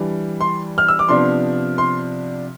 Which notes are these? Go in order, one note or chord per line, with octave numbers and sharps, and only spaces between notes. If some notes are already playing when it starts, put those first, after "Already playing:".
Already playing: E3 G3 D4
C6
F6
E6
D6
C3 F3 B3 D4 C6
C6